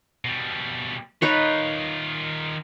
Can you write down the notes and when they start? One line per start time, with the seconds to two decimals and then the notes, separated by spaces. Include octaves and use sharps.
0.25 B2 G3
1.22 D#3 D#4 F4 B4 C#5